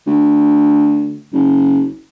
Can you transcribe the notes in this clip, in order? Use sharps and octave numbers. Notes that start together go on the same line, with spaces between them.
D2
F#1